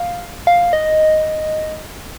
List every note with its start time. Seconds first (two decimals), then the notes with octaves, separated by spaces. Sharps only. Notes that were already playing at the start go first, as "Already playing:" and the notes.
Already playing: F5
0.47 F5
0.73 D#5